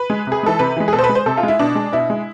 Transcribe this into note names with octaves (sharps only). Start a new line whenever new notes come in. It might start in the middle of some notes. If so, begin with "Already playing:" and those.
Already playing: B4
G#3
C3 G#4
E3 G#3 A4
C3 B4
E3 G#3
G#4
B2 A4
C5
B4
G#3
C5
C3 A4
F4
G#3
E4
B2 D4
G#3
B2 E4
G#3